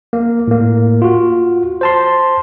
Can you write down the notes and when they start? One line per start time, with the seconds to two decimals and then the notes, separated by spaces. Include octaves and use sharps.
0.13 A#3
0.48 A2 A#3
1.02 F4 F#4
1.81 C5 A5 C6